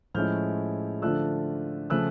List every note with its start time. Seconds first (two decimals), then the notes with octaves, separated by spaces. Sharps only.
0.14 A2 F3 G#3 C#4 E4 F6 G6
1.02 D3 F3 A3 D4 F4 E6 F#6
1.90 C#3 F3 A3 E6 F#6